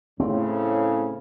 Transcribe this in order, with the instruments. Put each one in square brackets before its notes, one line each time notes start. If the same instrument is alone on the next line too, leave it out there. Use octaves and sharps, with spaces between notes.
[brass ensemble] A2 C#3 [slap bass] C4